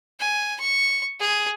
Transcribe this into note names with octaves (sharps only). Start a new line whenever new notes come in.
G#5
C#6
G#4